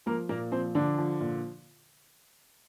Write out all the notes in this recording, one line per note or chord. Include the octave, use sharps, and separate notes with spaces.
F3 A#3 A#4
A#2 A#3 A#4
F3 C4 C5
D3 F3 D4
F3
A#2